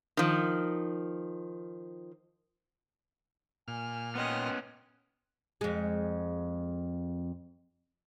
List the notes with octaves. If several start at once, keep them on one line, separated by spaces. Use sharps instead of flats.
D#3 F3
A#2 G#5 F6
B3 C#4 C5 D#5 G5
F2 G#3